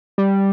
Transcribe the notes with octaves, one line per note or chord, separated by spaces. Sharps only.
G3